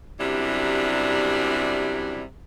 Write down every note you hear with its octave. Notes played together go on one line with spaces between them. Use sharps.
F#2 C3 G3 D4 E4